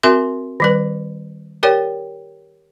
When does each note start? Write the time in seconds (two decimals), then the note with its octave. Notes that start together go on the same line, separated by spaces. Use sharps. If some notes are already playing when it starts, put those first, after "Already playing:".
0.03 C4 F#4 A#4 E5 C6
0.60 D#3 G3 B4
1.63 G4 A#4 C#5 D5 G5